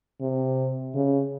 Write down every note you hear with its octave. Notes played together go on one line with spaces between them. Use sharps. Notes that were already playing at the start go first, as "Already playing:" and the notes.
C3
C#3